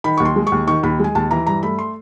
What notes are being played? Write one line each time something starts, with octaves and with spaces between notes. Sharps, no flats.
D#3 B5
D#2 C#6
C6
G#3
C#6
D#2
D#3 C#6
D#2 B5
G#3 G#5
D#2 A5
E3 A#5
G2 A#5
A3 B5
C6